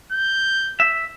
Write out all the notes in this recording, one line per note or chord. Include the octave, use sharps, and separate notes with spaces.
G6
E5